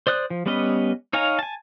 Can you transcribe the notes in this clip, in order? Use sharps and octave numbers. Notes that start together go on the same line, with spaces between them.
C5 D5 D#6 F#6
F3
G3 B3 C#4 B4 D#5
D#4 C#5 F5 G#5 A#5
G#5 A5